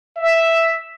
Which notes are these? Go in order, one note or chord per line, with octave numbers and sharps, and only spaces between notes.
E5